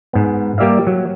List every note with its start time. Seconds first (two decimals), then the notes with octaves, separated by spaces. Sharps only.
0.13 G#2 B3
0.58 G3 A#3 G4 D5 E5 F5
0.87 F#3